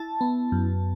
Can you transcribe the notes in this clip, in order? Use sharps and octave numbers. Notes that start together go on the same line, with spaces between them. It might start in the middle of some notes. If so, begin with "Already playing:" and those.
Already playing: E4 A5
B3
F#2